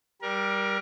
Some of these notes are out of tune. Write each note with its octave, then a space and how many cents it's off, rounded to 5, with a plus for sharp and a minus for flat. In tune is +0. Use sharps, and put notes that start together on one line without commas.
G3 +0 A#4 +25